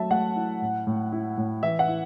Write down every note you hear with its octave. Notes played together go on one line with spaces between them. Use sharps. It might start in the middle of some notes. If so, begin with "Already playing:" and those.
Already playing: F#3 A3 E5 A5
A3 F#5
E4
A2
A2
E4
A2
E3 E5
F#5
E4